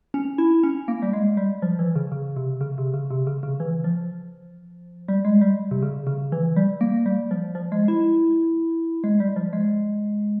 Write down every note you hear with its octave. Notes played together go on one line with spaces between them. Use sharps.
C#4
E4
C#4
A#3
G3
G#3
G3
F3
E3
C#3
C#3
C3
C#3
C3
C#3
C3
C#3
C#3
E3
F3
G3
G#3
G3
C3
C#3
C#3
E3
G3
A#3
G3
F3
F3
G#3
E4
G#3
G3
F3
G#3